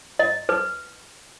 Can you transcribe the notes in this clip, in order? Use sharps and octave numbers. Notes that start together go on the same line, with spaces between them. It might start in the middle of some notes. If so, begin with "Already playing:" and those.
D#5
B4